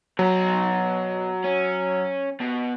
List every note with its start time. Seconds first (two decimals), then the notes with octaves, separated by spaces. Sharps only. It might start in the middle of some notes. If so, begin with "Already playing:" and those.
0.19 B2 F#3 A#5
1.44 C#4
2.40 B2